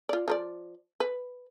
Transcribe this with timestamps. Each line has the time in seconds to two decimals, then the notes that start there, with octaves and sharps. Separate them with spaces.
0.09 F4 D5
0.28 F3 A#4 D5
1.00 B4